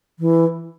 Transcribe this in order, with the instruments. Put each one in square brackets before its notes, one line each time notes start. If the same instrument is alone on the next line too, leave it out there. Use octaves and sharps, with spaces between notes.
[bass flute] E3